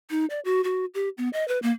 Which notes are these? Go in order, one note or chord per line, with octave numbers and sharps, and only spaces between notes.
D#4
D5
F#4
F#4
G4
B3
D#5
B4
A#3